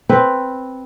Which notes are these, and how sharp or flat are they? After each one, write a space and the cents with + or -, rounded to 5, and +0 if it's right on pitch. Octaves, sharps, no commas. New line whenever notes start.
C4 +0 B4 +0